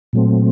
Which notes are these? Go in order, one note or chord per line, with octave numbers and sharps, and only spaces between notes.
A#2 F#3 A3 C4